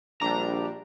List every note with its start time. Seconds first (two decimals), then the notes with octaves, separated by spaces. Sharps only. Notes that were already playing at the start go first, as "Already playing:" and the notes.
0.21 A#1 G3 D4 A#5